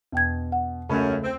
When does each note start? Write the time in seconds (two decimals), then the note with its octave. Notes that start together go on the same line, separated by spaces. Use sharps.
0.13 E2 B2 G5 G#6
0.52 F#5
0.89 C#2 F#2 A3 C#4 B5
1.24 C4